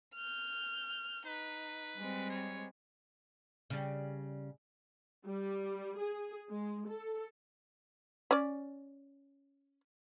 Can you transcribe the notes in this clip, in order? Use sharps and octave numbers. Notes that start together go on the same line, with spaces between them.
F6 G6
D#4 B4
G3 G#3 C4
C#5
C#3 G3
G3
G#4
G#3
A4
C#4 D5